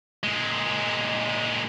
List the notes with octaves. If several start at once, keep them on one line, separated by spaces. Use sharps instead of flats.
A#2 G#3